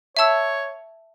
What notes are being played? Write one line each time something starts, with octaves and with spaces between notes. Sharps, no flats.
C#5 E5 A5 E6